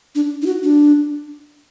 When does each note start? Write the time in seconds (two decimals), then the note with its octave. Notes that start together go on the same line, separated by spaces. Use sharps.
0.15 D4
0.42 D#4
0.46 F#4
0.63 D4